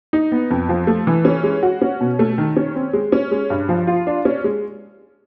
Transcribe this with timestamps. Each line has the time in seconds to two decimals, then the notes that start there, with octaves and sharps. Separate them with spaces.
0.13 D#4
0.32 B3
0.51 F2
0.69 F3
0.87 A3
1.07 E3
1.25 C#4
1.44 G#3
1.63 F#4
1.81 C#4
2.01 B2
2.19 A3
2.38 D#3
2.56 C#4
2.76 C4
2.93 G#3
3.12 C#4
3.31 G#3
3.50 G2
3.69 F3
3.87 F4
4.07 D4
4.25 C#4
4.44 G#3